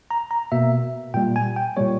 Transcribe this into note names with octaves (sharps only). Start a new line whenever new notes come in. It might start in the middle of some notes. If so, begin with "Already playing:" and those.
A#5
A#5
B2 A#3 E5
A#2 G3 A#3 G5
G#5
G5
A#2 G3 A#3 C#5